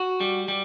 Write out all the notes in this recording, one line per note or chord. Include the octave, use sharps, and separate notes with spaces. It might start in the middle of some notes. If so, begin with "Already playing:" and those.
Already playing: F#4
G3
G3